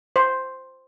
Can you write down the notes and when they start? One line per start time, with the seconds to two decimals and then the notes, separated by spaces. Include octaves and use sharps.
0.16 C5